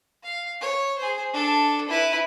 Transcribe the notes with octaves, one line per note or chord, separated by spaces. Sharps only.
F5
C#5
G#4 C5
D4 A4
E4 B4